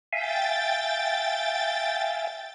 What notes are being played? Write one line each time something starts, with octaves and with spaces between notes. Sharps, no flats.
E5 F5 G5 G#5 A6